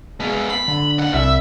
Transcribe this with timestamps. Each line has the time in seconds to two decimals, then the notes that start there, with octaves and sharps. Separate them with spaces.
0.20 G#3 B3
0.50 B5 C7
0.68 D3
0.98 D#2 F#5
1.14 C2 E5